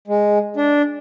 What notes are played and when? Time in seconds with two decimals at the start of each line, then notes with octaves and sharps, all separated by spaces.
0.08 G#3
0.57 D4